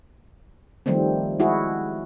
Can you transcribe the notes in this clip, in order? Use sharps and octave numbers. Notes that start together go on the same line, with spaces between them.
D#3 F3 G3 A3 C4
G#3 E4 F#4 G#4